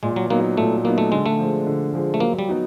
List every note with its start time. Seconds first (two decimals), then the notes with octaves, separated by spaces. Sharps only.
0.03 A#2 G#3
0.16 F#3
0.30 F#3 A#3 B3 D#4
0.57 A#2 A3
0.84 F#3 A#3 B3 D#4
0.98 A3
1.12 D3 G#3
1.26 A3
1.39 F3 G#3
1.67 D3
1.94 F3 G#3
2.14 A3
2.20 F#3 A#3
2.39 G3
2.48 B3 D#4 F#4